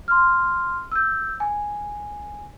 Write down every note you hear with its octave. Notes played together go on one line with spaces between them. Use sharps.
C6 F6
E6 G6
G#5